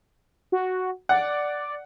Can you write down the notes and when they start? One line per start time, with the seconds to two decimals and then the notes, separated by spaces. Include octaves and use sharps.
0.52 F#4
1.09 D5 F#5